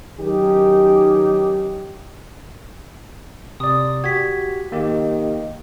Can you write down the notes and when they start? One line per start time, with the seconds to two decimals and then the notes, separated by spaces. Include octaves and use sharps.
0.19 D#3 F#3 C#4 D#4 G4
3.60 C3 D5 D#6
4.04 F#4 G4 G#6 B6
4.72 D#3 A#3 G4